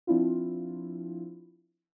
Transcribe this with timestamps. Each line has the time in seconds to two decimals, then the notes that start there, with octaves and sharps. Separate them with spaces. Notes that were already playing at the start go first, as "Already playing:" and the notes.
0.07 F3 C4 D4 E4 F4